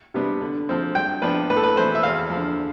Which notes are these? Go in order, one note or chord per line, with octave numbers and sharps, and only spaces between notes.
C3 G3 B3 D4
D3
F3 C4
G2 G5
F3 B3 D4 B4
A2 B4
A4
B4
E3 A3 C4 C5
E5
E2 F5
F3
D3